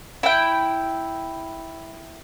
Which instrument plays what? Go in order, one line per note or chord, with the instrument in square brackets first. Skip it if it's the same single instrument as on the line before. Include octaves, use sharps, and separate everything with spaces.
[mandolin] E4 G5